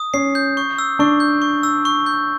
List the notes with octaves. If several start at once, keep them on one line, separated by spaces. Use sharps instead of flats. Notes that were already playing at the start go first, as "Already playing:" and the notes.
Already playing: D#6
C#4 C7
G6
C#6
E6
D4 C#6
G6
C#6
E6
C#6
G6